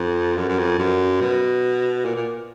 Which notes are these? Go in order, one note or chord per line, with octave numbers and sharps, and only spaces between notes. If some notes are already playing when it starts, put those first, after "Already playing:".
Already playing: F2
F#2
F#2
F2
F#2
B2
A#2
A#2